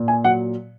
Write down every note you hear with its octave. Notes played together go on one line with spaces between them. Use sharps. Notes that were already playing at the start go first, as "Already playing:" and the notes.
Already playing: A#2
G#5
F#3 F#5